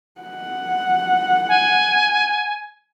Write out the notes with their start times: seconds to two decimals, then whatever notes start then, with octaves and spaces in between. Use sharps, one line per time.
0.21 F#5
1.49 G#5